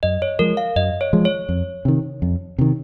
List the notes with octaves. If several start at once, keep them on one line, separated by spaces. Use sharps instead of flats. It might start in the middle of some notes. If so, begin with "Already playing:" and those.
F#2 D#5
C#5
F3 G#3 A#4
F5
F#2 D#5
C#5
F3 G#3
C#5
F2
C3 D#3
F2
C3 D#3